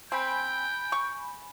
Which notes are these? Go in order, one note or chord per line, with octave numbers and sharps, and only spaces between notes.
C4 G5 G#5 B5
C#6